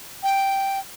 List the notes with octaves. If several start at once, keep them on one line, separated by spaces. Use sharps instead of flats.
G5